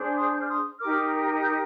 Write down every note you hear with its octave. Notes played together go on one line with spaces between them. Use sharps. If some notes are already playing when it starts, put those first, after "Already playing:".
Already playing: D4 G#4 C5
C6 D#6
G6
F6
C6 D#6
D#4 G4 A#4 D6 F6
D#6 G6